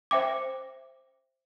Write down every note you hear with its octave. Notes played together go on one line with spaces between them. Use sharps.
C5 E5 G5 D6